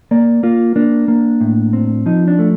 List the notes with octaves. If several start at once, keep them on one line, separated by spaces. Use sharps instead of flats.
A#3 D5
A#3 F4
A#3 D4
A#3
A2
C4
F3 D#4
D4
A3